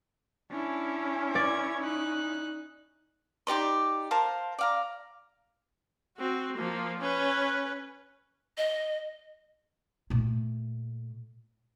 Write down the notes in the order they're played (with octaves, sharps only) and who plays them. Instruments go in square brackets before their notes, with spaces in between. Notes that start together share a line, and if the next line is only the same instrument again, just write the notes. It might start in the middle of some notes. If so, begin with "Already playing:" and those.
[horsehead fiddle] C#4 E4 [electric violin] D4
[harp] D5 [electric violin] G#6
[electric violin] D#4 F#6
[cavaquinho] D#4 G4 D5 C6
A#4 C5 F5 A5
D5 F5 A#5
[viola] C4 F#4
F3 A#3
C#4 B4
[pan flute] D#5
[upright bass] A#2 A3